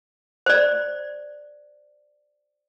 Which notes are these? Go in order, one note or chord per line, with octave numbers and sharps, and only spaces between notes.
C5 D5